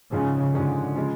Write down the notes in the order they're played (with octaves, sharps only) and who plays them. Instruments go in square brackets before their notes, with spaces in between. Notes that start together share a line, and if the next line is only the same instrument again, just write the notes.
[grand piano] G#2 F3 G#3 C#4 G#4 [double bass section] C#3
[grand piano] G#2 F3 G#3 C#4 G#4 [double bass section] D3
[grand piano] C#3 F3 G#3